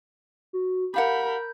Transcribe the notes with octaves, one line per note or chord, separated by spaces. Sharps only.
F#4
G4 A#4 F5 F#5 B5 G6